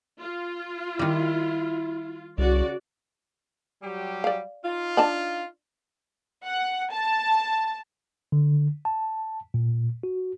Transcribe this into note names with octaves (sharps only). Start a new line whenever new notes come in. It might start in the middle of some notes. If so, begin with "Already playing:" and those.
F4
D#3 G3 E4
C2 C#3 F#4 D5
F#3 G3 G4
D5 F5
D#4 F4
D4 A5 B5
F#5
A5
D3
A5
A#2
F#4